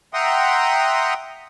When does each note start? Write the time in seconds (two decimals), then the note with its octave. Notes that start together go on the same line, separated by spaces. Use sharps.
0.14 E5 F#5 G5 A#5 C6 D#6